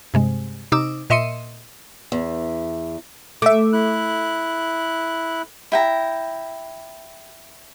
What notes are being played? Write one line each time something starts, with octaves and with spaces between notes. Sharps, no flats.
G2 C3 G#3
C3 D#4 D6 E6
A#2 D#5 E5 C6 C#7 D#7
E2
A3 E5 D6
E4 F#6
E4 G5 A#5